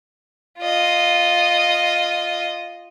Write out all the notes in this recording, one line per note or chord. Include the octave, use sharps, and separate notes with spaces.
F4 D#5